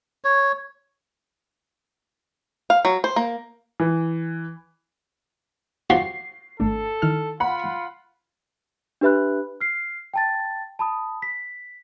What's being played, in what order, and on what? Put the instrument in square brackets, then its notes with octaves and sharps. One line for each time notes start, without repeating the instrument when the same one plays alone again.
[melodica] C#5
[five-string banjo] F5
F#3
C5
A#3
[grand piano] E3
[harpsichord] F3 F#4 G4 [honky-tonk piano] C7
[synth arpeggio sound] G#1 A3 D4 [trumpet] A4
[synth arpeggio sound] D#3 E4 F6
[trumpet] F4 [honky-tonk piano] F#5 B5
[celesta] D4 G4 B4 E5 B5 F#6
F6 C7
G5 A5 A6
A5 B5 D#6
B6